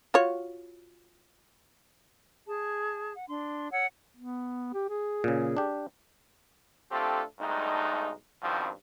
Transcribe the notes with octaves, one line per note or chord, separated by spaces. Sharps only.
F4 F#4 C#5
G#4 A5
F#5
D4 C6
C#5 F#5 E6
B3
G4
G#4
A#2 C#3
D4 G4
A3 C4 D4 F4 G4 A4
B1 G2 G#3 A3 D#4
G2 B2 D#3 F3 C4